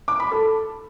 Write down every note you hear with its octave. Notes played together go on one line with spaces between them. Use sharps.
D6
B5
A4